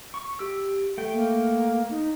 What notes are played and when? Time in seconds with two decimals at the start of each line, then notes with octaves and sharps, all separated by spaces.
0.14 C#6
0.39 G4 E6
0.98 A3 G5
1.13 A#3
1.90 D#4